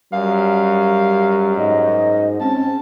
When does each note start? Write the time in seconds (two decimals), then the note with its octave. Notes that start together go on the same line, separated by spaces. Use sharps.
0.13 F#2 G3 F5
1.57 G#2 D#5
2.40 C4 C#4 A5